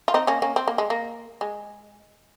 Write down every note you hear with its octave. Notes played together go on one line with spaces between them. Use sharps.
F4
C4 D#4
A#3 C#4
A#3 C#4
C4
A#3
G#3
A#3
G#3